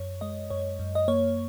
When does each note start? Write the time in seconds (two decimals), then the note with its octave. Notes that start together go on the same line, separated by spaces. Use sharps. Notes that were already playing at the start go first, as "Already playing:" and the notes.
Already playing: F#2 C#5
0.21 G#3 D#5
0.50 F#2 C#5
0.79 F#2
0.95 D#5
1.08 A#3 C#5